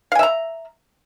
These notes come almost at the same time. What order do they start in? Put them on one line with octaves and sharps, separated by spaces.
F5 G#5 E5 A#5